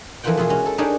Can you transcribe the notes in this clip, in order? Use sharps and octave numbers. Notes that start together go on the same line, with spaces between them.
F2 E3 A#3 F4 F#5 G5
B2 E3 E4 F4 G#4
G#3 C#4 F#4
A4
D4 D#4 G4 G#4 A#4 C#5